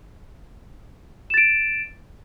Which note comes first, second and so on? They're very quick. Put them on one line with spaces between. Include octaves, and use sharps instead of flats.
E7 A6 D7